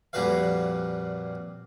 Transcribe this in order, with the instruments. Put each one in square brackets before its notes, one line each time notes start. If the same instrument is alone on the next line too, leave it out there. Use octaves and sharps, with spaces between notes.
[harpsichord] F2 A#2 G3 F#4 B4 F5